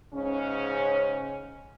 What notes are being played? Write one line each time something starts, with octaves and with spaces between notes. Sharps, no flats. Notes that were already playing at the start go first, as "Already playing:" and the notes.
G#2 C#3 C#4